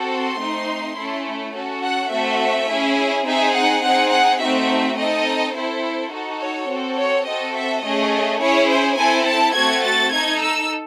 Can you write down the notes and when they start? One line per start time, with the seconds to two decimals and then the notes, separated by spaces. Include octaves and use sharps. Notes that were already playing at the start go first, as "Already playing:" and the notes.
Already playing: C4 F#4 A4
0.11 C6
0.40 A3 C4 D#4
0.97 A3 C#4 E4 A4
1.54 C#4 F#4 A4
1.83 F#5
2.12 A3 C4 F#4 A4 E5
2.69 C#4 E4 G#4
3.26 C4 D#4 G#4 E5
3.55 F#5
3.83 C4 D#4 G#4 F#5
4.12 F#5
4.41 A3 C4 D#4 F#4 E5
4.98 C4 D#4 A4 D#5
5.55 C4 E4 A4 C5
6.12 D#4 F#4 A4
6.40 C#5
6.69 C4 F#4 A4
6.98 C#5
7.26 C4 F#4 A4 D#5
7.55 E5
7.84 A3 C#4 G#4 D#5
8.41 C#4 E4 G#4 C#5
8.69 C5
8.98 C4 E4 A4 G#5
9.27 A5
9.55 A3 C4 F#4 A4 G#6
9.84 A6
10.12 D#4 A4 G#6
10.41 E6